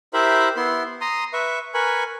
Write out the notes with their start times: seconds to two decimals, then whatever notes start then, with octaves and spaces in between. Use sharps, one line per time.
0.14 E4 G4 A#4 C5 E5 B5
0.57 B3 E4 C6
1.01 A#5 C6 D#6
1.33 B4 E5 C#6
1.74 A#4 B4 G#5 B5 C#6